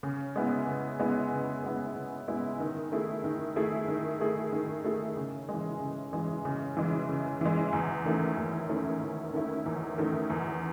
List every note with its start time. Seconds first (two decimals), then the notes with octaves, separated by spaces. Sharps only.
0.03 C#3
0.36 G#3 B3 E4
0.67 C#3
1.00 G#3 B3 E4
1.31 C#3
1.64 G#3 B3 E4
1.96 C#3
2.28 G#3 B3 E4
2.60 D#3
2.92 A3 E4 G#4
3.24 D#3
3.56 A3 E4 G#4
3.88 D#3
4.20 A3 E4 G#4
4.52 D#3
4.84 A3 E4 G#4
5.17 C#3
5.49 E3 G#3
5.81 C#3
6.13 E3 G#3
6.45 C#3
6.77 E3 G#3
7.09 C#3
7.41 E3 G#3
7.73 E2
8.05 D#3 A3 C#4 E4
8.37 E2
8.69 D#3 A3 C#4 E4
9.02 E2
9.33 D#3 A3 C#4 E4
9.66 E2
9.98 D#3 A3 C#4 E4
10.30 E2